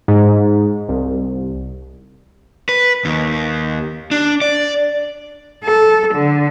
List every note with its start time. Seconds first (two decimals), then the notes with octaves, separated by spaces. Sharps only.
0.08 G#2
0.89 C2
2.69 B4
3.05 D#2
4.11 D4
4.41 D5
5.64 A4
6.14 D3